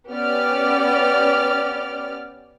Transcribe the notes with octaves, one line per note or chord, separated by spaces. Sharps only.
B3 C#4 G4 D5 F6